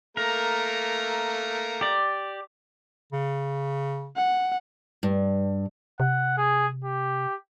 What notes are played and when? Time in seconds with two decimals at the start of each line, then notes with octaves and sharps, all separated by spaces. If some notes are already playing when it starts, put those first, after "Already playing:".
0.17 A3 A#3 A#4 A#5
1.81 G4 D5
3.12 C#3
4.17 F#5
5.03 G2
6.00 C3 F#5
6.37 G#4
6.84 G4